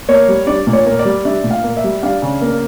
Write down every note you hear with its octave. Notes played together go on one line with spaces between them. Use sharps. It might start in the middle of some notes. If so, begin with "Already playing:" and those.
A#3 C#5
G3
D4 D5
A#2
C#5
A#3
D5
G3
D4 E5
A#2
F5
A#3
E5
G3
D4 F5
C#3
A#3